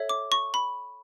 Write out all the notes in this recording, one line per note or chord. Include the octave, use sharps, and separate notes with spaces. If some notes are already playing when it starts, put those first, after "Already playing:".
Already playing: A4 C#5 E5
D6
C#6
B5